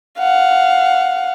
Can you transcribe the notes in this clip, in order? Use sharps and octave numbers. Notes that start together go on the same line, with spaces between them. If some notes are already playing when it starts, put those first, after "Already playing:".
F5 F#5